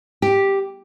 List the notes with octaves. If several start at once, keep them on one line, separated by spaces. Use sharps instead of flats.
G4